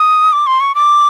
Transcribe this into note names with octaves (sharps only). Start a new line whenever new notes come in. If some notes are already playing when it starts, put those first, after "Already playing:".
Already playing: D#6
D6
C6
C#6
D6